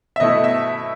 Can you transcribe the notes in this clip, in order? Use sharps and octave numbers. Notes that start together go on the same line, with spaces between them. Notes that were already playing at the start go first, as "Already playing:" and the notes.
E5
B2 A3 E4 D#5
E5